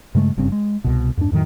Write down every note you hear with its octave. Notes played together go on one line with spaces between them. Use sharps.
G2 C#3 G#3 A3
F#1 G2 C#3 C4
G#3
C2 B2
F2 G#2 C#4 D4
F2 A2 D#3 F#3